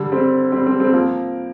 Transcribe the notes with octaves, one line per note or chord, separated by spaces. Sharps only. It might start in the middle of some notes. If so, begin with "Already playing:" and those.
Already playing: D3 G3
G3 C4
G3 C4
G3 C4
G3 C4
F3 A#3